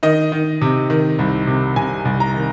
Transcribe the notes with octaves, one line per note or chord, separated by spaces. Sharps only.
D#3 D#5
D#3
C3
D#3
C2
C3
C3 G#5
C2
A#5
D#3